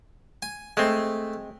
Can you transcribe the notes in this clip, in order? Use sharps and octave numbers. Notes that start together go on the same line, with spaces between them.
G#5
G#3 A3 C4